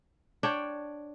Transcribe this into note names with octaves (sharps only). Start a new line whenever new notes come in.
D4 C#5 G5